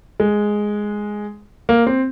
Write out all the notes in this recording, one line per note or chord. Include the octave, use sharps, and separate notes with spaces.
G#3
A#3
C4